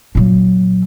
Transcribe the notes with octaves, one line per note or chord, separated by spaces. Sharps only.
A#2 F#3